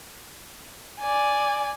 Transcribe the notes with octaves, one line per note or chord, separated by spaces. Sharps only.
D5 G#5